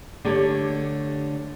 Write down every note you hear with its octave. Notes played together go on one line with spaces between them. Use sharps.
D3 A3 G4 A4 C#5